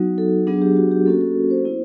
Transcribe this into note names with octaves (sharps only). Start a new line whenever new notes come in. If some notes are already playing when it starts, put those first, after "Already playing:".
Already playing: F#3 B3 D#4 F#4
A4
F#3 B3 D4 G#4
G4
F#4
G4
A#3 C#4 F#4 A4
A4
A#4
C5
B3 E4